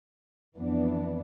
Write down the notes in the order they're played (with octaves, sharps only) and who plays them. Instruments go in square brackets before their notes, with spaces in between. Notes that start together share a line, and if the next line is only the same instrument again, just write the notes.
[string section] F2 E3 B3 D4